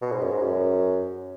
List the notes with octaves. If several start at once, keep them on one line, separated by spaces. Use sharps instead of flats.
B2
G#2
F#2
G#2
F#2